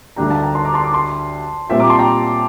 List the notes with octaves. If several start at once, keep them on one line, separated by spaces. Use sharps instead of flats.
D2 D3 G3 D4 G4 G5 A#5
F5 A5
G5 A#5
A5 C6
A#5 D6
A5 C6
A#5 D6
A5 C6
A#2 G3 C4 F4 E5 G5
A#5 D6
A5 C6
G5 A#5